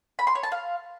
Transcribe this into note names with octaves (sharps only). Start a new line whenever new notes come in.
B5
C6
C#5
A5
F5